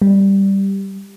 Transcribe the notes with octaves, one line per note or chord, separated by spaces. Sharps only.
G3